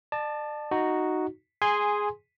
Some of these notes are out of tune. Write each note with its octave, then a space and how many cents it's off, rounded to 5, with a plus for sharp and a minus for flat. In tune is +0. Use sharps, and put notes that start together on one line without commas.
D5 +40 A5 +0
D#4 -5 F#4 +0
G#4 +0 G#5 -10 C6 +0